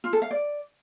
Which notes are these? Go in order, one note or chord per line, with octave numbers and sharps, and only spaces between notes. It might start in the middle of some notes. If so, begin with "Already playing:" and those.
F4
A4
F5
D5